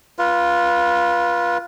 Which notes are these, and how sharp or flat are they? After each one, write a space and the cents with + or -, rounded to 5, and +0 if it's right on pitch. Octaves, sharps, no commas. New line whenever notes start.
F4 +0 B4 -25